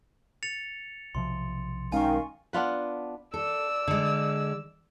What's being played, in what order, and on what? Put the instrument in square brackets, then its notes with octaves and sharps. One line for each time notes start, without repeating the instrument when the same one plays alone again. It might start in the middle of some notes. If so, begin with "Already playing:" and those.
[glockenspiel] A6 C#7 F7
[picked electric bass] B1 C3 F3 [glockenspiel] C6
[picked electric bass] B1 G#3 C#4 [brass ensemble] D#3 [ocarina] F5 [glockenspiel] G#5 C#6
[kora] B3 D4 F4 B4
[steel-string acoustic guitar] A4 [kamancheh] D5 E6
[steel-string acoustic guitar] D3 G#3